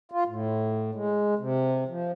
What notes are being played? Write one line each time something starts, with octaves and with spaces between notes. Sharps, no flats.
F4
A2
G#3
C3
F3